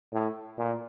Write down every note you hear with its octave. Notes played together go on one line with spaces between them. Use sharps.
A2
A#2